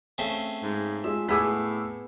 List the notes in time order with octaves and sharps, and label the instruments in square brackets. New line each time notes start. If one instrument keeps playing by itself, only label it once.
[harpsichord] C#3 A3 C4
[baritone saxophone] G#2
[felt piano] G#3 F4 [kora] E5
[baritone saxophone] A2 [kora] B3 G#4 [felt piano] D6 E6 B6